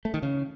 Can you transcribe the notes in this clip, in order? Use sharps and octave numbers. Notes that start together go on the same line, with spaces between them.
A3
D#3
C#3